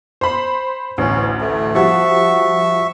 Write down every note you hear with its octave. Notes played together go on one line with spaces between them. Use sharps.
C5 B5
A1 D2 C#4
A3
F3 G3 F#4 E5 C#6